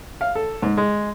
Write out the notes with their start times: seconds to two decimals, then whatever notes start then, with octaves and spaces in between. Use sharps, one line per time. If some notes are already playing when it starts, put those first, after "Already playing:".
0.21 F5
0.35 A4
0.62 G#2
0.77 G#3